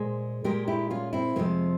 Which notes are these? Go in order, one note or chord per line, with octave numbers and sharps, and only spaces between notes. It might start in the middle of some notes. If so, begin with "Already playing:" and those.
Already playing: A#2 G#3 G#4 C5
A#2 G#3 G4 A#4
E4 G4
C#4 F4
C4 E4
F2 C3 F3 G#3 A#3